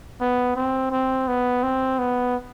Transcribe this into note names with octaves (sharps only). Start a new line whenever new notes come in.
B3
C4
C4
B3
C4
B3